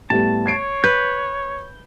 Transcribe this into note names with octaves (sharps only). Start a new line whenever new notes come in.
A2 G3 B3 A5
C#5 G#6 C7 D7
B4 G6